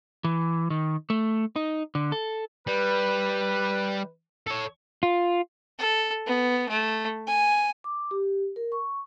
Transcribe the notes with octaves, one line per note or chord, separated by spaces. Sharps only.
E3
D#3
A3
D#4
D3
A4
G3 B4
A4 C#5
F4
A4
B3
A3
G#5
D6
G4
A#4
C#6